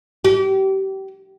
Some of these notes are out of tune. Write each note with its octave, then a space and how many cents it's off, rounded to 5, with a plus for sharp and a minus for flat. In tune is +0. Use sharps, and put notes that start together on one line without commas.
G4 -30